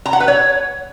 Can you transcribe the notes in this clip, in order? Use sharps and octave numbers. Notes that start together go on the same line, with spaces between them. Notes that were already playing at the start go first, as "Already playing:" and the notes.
A#5
F#5
B4
C#5